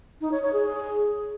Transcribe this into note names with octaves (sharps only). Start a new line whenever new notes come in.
D#4
C#5
C#5
G#4